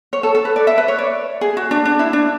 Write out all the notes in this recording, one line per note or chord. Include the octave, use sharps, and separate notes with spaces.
C#5
A4
A4
B4
D5
E5
B4
C#5
D5
G#4
F#4
D4
D4
E4
D4